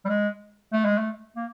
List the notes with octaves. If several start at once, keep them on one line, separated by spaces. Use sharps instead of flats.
G3
G#3
A3
G#3
A3
A#3